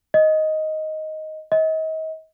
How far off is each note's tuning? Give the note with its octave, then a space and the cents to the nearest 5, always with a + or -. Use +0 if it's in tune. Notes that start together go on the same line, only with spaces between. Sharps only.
D#5 +5
D#5 +35